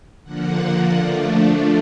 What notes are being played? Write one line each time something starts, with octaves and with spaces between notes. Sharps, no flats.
D3 F3 A#3 F#5
F3 A3 D4